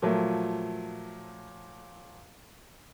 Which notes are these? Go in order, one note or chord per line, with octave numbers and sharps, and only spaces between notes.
A#2 F3 F#3 A3